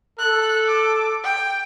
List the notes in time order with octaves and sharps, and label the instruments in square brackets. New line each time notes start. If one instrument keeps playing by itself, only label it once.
[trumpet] A4 [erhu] F#6
[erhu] D6
G5